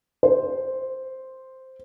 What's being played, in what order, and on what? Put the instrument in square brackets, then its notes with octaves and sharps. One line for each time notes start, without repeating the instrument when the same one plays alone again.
[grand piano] C5